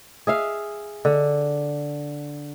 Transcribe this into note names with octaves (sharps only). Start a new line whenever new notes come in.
G#4 E5 F5
D3